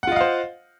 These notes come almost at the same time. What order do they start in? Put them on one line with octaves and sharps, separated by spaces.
F#5 F4 D#5 F5 C5